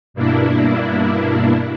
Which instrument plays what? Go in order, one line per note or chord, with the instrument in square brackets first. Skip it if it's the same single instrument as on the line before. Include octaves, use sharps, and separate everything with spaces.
[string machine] G2 B2 A#3 D4 E4